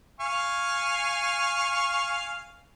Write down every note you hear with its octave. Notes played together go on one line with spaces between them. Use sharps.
F5 G#5 C#6